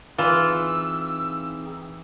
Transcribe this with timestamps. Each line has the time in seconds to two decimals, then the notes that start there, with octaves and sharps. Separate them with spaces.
0.18 E3 C4 D#4 F4 G#4 E6